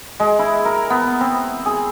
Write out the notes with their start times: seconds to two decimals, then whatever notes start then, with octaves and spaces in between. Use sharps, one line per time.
0.20 G#3
0.39 E4
0.65 A#4
0.90 B3
1.21 C4
1.66 G#4